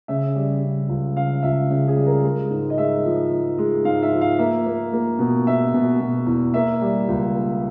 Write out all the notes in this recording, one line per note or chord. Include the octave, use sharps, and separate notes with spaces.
C#3 E5
G3
C#3
C#2
C#3 F5
C#2 E5
C#3
G#4
G3
A#4
G#3
G#2
D#5
G#3 E5
F3
F3
G#3
G#2 F5
E5
F3
F5
A#3 E5
A#3
A#3
B2
B2 E5
B2
B2
E2
A#3 E5
G3
C#2
A#3